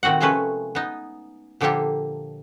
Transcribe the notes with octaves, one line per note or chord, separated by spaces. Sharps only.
A#2 D#3 C4 F#4 F#5
C3 F3 G#3 A3 C#4 B4
B3 D#4
A#2 D3 F3 A#3 G4 A4